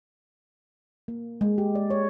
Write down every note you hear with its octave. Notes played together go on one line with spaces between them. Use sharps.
A#3
G#3
G4
D5
C#5